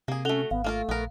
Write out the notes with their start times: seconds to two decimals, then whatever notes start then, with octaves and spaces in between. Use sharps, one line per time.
0.08 C3 A#3 G#4
0.25 A3 C#4 F#4 A4 F7 G7
0.51 G#1 B3 F5
0.64 A3 A#3 F4 A#4
0.89 A#1 B3 A#4